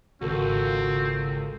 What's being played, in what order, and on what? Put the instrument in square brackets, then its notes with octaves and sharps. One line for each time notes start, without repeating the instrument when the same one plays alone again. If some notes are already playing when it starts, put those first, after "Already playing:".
[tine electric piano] G#1 A4 A#4 [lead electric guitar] C#2 [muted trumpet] C4 [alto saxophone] F#4